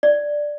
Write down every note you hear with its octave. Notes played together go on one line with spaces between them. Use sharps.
D5